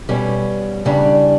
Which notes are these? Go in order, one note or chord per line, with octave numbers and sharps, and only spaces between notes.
B2 G3 C#4
E2 C#3 G3 D4